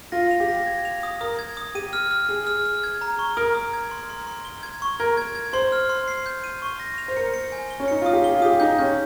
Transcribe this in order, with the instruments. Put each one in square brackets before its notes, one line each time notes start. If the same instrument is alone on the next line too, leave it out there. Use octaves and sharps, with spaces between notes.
[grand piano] F4 [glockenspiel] A#6
[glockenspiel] F7
[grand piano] G4
[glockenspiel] A#6
G#6
F7
D#6
[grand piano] A#4 [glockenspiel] D#6
[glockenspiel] G#6
D#6
[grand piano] G4 [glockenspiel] D#7
[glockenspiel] F6
F6
[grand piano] G#4 [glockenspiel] F6
[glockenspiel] F6
F6
G#6
A#5
C#6
[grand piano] A#4 [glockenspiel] D#6
[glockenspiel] D#6
G#6
C6
C6
C6
G7
G#6
C#6
[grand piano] A#4 [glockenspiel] G#6
[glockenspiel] G#6
G#6
[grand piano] C5 [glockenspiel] C6
[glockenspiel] F6
C6
C7
G6
D#7
C#6
A#6
F7
[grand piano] C5
[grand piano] A#4 [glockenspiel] C#7
[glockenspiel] C#7
G#5
G7
[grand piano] C#4
[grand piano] D#4 [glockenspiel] C#7
[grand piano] F4 [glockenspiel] D#6
[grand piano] G4
[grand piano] G#4 [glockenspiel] G7
[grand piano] F4
[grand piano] G4 [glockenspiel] D#6
[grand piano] D#4 [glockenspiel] G6
[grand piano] C#4 [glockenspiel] G6